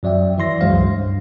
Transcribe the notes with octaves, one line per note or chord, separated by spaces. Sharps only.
F#2 F#3 D5 E5 G5
E3 E5 C6 A#6
C#2 F#2 F#3 G#3 C5 F5
G2